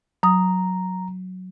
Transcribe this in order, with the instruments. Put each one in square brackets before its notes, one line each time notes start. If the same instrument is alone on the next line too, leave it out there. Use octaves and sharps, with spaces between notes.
[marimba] F#3 D#6 [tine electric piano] A#5